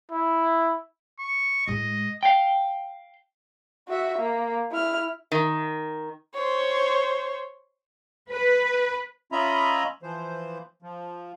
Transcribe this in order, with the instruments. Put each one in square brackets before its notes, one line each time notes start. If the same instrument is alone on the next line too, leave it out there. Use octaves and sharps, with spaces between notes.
[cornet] E4
[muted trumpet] C#6
[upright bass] A2 G#3 [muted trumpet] D#5
[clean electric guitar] F5 G5
[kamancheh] F#4 E5
A#3
E4 F6
[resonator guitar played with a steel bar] D#3
[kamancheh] C5 C#5
[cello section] B4
[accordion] C#4 F4 D#5 E5 A#5 B5
E3 F3 C5
F3